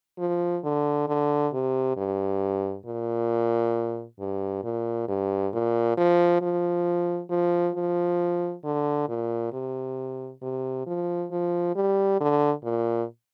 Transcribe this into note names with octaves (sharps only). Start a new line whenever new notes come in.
F3
D3
D3
C3
G2
A#2
G2
A#2
G2
A#2
F3
F3
F3
F3
D3
A#2
C3
C3
F3
F3
G3
D3
A#2